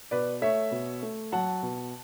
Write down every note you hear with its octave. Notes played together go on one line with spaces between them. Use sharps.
B2 B4 D5
A3 C#5 E5
B2
A3
F#3 F#5 A5
B2